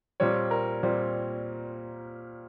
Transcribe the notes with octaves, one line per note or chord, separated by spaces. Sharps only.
A#2 G3 C4 C#5
A#4
A#2 G3 C4